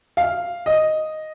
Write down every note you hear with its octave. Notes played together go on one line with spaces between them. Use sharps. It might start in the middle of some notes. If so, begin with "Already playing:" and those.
F5
D#5